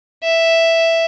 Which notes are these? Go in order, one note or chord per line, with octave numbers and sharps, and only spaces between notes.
E5